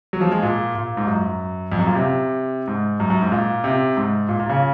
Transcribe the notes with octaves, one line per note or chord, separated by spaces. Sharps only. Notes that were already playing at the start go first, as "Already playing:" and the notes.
F#3
F3
G#3
A#2
A#2
G#2
F#2
F2
F#2
A#2
C3
G#2
F#2
F#2
G#2
A#2
C3
G#2
A#2
A#2
C#3